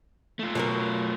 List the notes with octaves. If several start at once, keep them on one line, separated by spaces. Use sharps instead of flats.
A3 F4
B2 F#3 A#4